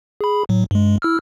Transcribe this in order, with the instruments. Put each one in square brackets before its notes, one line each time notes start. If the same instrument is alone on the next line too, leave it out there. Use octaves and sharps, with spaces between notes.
[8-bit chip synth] G#4 B5
A2 F#3
G2 G#3
E4 E6 F6